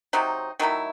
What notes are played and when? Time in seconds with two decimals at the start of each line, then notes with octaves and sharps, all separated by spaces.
0.13 C3 F#3 C4 D#4
0.60 D#3 F#3 A3 E4